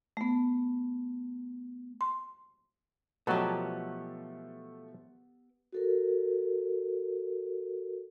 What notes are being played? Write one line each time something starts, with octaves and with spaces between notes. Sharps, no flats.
A3 B3
C6
B2 F3 F#3 A3 B3 G4 A5 A#5
F#4 A4 A#4